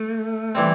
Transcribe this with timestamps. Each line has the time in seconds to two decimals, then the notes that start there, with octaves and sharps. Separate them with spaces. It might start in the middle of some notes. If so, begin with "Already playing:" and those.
Already playing: A3
0.55 E3 G3 C4